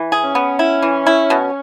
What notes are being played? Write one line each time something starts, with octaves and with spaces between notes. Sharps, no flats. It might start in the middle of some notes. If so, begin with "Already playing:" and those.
Already playing: E3
G#4
C#4
B3
E4
E3
E4
B2